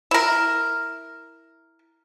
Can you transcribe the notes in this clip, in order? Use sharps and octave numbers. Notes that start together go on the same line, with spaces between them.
E4 A#4